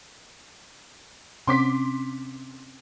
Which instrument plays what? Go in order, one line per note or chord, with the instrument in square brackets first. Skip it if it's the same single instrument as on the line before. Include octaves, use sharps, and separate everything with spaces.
[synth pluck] C3 C4 C#4 [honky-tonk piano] C6 D6 B6